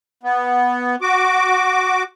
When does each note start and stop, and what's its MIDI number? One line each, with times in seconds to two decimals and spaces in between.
0.23 0.96 59
1.02 2.03 66
1.02 2.03 86